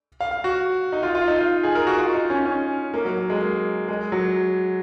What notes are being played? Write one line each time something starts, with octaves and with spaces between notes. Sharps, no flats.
F5
F5
F#4
D#4
F4
F4
D#4
F4
G#4
A#4
F#4
F4
D#4
C#4
C#4
A#3
F#3
F#3
G#3
A#3
G#3
F#3